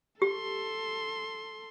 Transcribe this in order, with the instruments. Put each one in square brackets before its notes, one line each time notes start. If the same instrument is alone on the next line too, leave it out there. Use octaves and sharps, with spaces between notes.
[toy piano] G4 [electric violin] A4 C6